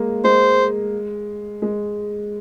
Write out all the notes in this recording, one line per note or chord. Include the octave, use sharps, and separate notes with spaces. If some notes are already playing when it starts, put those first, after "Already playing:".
Already playing: G#3 A#3
G#3 C5
G#3